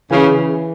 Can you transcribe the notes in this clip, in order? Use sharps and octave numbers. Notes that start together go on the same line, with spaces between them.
C#3 E3